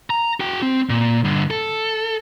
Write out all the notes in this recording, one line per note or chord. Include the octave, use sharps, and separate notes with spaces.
A#5
F#4 G5
C4
A#2
G2 D3
A4